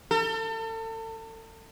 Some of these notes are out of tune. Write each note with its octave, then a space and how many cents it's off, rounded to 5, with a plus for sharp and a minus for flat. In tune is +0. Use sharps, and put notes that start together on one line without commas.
A4 +35